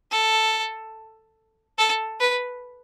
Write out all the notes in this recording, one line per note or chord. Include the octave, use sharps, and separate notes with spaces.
A4
A4
B4